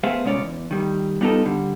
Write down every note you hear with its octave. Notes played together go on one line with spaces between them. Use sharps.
A3 B3 G#4 C5 E5 F5
C2 A#2 G#3 C#4 C#5 D5
E2
D#3 G3
G3 B3 D#4 F4 A4
D3 G3